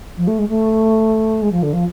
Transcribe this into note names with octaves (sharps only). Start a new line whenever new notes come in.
F3
A3
G#3
A3
G#3
F3
D3
F3